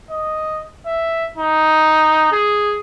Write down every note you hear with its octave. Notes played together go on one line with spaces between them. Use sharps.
D#5
E5
D#4
G#4